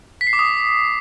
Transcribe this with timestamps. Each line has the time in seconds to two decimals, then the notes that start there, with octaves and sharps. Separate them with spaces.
0.21 B6
0.27 C7
0.33 D6
0.39 D#6